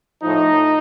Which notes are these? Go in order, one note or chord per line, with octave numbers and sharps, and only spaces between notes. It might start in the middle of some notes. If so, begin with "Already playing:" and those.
A2 F3 D#4